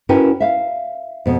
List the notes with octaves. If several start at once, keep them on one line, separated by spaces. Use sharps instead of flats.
C#4 E4 F#4 A#4 B4 G5
E5 F5
F2 B2